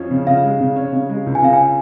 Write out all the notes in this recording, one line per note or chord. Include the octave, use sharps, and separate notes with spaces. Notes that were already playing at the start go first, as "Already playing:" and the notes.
Already playing: F2 F3 C#4
C#3
C#3 F5
G#3
C#3
C#4
C#3
G#3
C#2
G#5
C#3 F5
G#5